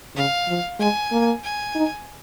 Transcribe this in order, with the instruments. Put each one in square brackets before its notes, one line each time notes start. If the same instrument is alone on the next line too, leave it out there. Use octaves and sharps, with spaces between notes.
[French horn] C#3 [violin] F5
[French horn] F3
[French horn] G#3 [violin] G#5
[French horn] A#3
[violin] G#5
[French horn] D#4